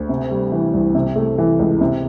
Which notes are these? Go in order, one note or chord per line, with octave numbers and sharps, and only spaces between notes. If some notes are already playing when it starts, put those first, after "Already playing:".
Already playing: D2
C3
G3
E3
C2
C3
A3
E3
C#2
C3